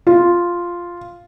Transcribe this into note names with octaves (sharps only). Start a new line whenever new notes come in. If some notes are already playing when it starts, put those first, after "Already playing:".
F4